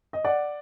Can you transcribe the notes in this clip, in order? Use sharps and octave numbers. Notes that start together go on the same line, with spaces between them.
D#5
D5 F#5